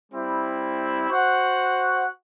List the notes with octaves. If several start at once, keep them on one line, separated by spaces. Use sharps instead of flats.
G3 C4 E4
F#4 C5 F#5